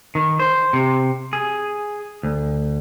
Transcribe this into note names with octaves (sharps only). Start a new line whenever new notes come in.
D#3
C5
C3
G#4
D2